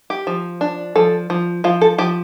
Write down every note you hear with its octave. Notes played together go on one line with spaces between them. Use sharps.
G4
F3
D4
F3 A4
F3
F3 F4
A4
F3 G4